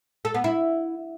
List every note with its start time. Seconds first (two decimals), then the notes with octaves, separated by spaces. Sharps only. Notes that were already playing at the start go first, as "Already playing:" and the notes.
0.25 A4
0.34 B3
0.44 E4